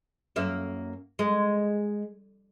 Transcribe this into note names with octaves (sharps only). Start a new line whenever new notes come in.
F#2 A#3 E5
G#3